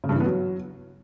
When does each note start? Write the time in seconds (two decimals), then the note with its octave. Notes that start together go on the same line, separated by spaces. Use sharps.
0.04 C#3
0.09 G2
0.15 E3
0.20 B3
0.26 F#3